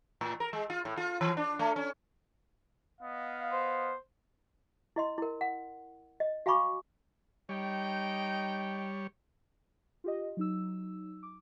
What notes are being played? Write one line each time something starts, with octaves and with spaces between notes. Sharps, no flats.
A2
A#4
G#3
F4
A2
F4
E3
D4
A3
C#4
B3 D#5 F5
C5
E4 D#5 C6
E4 A#4
F#5
D#5
F#4 F5 G#5 B5 C#6 D6
G3 D#4 C#5 G5
F4 G4 D#5
F#3 D#4 E6
D6